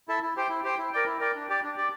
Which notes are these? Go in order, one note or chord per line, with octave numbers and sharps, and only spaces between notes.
E4 A4 E5
E4
G4 C5 G5
E4
G4 C5 G5
E4
A#4 D5 G5
E4
A#4 D5 G5
D4
G4 D5
D4
G4 D5